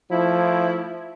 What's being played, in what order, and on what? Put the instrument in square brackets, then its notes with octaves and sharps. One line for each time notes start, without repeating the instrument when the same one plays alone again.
[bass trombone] F3 [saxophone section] A3 E4